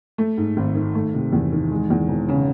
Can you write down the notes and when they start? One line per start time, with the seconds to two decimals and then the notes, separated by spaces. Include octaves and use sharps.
0.18 A3
0.37 G#2
0.57 G#1
0.75 D#3
0.95 A3
1.14 C3
1.33 E2
1.52 D#3
1.71 G#3
1.90 E2
2.08 E1
2.29 C#3